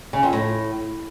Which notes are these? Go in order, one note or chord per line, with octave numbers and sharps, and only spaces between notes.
C#3
F2
A2